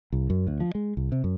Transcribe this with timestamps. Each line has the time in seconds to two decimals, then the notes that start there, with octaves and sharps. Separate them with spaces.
0.12 C2
0.30 F#2
0.47 D2
0.60 F3
0.75 G#3
0.97 C2
1.12 C3
1.24 F#2